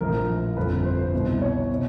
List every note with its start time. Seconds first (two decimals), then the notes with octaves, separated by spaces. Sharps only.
0.01 A#1 A2 F3 A#4
0.57 G1 F2 D3 B4
0.85 C5
0.99 C5
1.13 C2 B2
1.42 C#5
1.72 B2